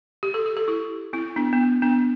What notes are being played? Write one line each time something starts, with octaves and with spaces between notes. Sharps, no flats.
G4
A4
G4
A4
E4 G4
C4 E4
B3 D4
B3
C4
B3 D4